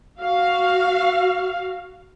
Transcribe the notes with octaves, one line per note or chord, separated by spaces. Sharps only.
F#4 F5